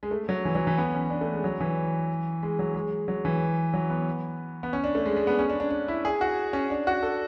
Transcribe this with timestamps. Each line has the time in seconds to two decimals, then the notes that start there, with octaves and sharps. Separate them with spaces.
0.03 G#3
0.11 A3
0.29 F#3
0.45 E3
0.55 F#3
0.67 E3
0.78 B3
0.94 C#4
1.10 D4
1.21 A3
1.33 G#3
1.44 F#3
1.60 E3
2.43 G#3
2.59 F#3
2.74 G#3
3.08 F#3
3.25 E3
3.74 F#3
3.90 B3
4.63 B3
4.73 C#4
4.84 D4
4.95 A3
5.06 G#3
5.16 G#3
5.27 B3
5.39 C#4
5.50 D4
5.60 D4
5.71 D4
5.88 E4
6.05 G#4
6.21 F#4
6.53 C#4
6.70 D4
6.87 F#4
7.02 A4